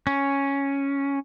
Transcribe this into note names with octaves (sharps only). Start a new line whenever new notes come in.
C#4